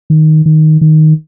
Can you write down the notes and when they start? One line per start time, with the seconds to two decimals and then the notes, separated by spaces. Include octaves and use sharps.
0.10 D#3
0.46 D#3
0.81 D#3